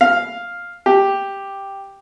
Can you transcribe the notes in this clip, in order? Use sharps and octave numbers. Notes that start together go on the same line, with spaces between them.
F5
G4